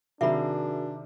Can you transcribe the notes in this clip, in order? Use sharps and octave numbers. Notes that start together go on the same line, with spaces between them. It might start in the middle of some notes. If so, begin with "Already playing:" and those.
C3 D#3 D4 F#4 G#4 A#4 E5 B5